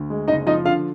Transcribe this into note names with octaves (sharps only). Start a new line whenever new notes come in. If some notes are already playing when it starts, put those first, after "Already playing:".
Already playing: D2
G#3
F#1 D#4 D#5
F3 D#4 D#5
D3 F4 F5